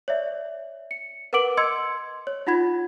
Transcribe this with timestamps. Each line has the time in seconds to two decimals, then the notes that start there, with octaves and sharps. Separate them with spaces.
0.08 C#5 D5 E5
0.91 C#7
1.33 A#4 B4 F#5 D6 D7 F#7
1.57 D#5 C6 E6 G#6 C#7
2.27 C#5
2.47 D#4 F4 F#5 B5 G#6